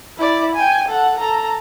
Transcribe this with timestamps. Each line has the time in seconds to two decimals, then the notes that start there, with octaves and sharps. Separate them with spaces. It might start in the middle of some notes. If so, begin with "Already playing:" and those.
0.18 E4 D5
0.55 G5 G#5
0.88 A4 F#5
1.18 A4 A#5